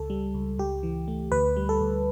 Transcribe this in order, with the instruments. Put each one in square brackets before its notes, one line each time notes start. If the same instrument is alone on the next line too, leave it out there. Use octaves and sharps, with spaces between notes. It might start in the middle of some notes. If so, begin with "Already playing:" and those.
Already playing: [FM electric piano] C#2 A4
G3
C#2
C#2 G4
E3
A3
D2 B4
G3
A4
D2